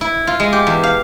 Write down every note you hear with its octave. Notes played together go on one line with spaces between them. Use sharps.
E4
F4
G#3
G4
E2
F5